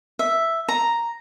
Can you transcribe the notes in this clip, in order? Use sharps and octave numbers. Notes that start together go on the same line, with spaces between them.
E5
A#5